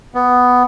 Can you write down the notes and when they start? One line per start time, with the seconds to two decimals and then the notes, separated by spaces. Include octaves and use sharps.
0.14 B3